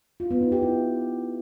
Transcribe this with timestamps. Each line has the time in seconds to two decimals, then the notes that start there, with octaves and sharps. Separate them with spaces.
0.20 F4
0.31 B3
0.41 D#4
0.52 G4
0.62 E4